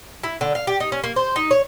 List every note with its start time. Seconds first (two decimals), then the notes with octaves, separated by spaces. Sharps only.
0.23 E4
0.41 D3
0.55 F5
0.67 G4
0.80 D#4
0.92 C#4
1.04 A#3
1.16 C5
1.36 D#4
1.51 C#5